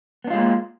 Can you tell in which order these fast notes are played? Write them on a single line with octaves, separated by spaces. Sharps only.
B3 D4 F4 G#3 A#3